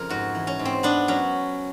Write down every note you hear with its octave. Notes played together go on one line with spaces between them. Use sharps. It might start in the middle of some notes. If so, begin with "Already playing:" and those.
Already playing: F2 C#3 A#4
G#2 F#4
E3
C#4
G#2
C4
B3 D4
F#3 C#4